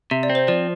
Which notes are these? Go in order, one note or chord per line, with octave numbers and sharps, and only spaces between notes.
C3 E5
D5
C4
C5
F3 D5